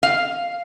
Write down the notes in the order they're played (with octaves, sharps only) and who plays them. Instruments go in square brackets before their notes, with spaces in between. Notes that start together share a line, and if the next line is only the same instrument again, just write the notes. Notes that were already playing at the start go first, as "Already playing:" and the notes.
[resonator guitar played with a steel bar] F5